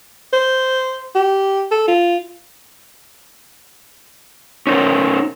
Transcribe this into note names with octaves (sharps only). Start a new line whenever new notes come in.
C5
G4
A4
F4
C#4 D#4 A#4 C5